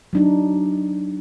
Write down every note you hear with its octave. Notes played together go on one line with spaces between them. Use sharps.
F#3 D4 D#4